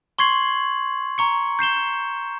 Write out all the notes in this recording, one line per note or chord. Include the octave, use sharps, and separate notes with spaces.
C6 C#6 G#6 C7 F#7
A#5 C#6 C#7
G6 C7 E7 G7